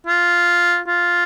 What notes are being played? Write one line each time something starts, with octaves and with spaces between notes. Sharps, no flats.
F4
F4